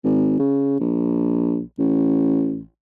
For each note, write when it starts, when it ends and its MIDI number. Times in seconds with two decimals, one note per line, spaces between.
0.04 0.36 32
0.39 0.79 49
0.80 1.61 34
1.79 2.64 33